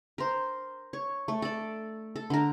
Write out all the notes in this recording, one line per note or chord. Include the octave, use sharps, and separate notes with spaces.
A#4 C5
C#5
A3
A4 D5
A4
D3 A#4